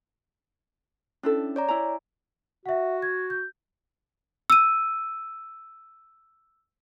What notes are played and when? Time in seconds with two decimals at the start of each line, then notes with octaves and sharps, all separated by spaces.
1.23 C#4 D4 E4 A4
1.56 C#5 D5 A#5
1.68 E4 G#5 A#5
2.66 F#4 E5 F#5
3.02 G#6
3.30 G6
4.50 E6 D#7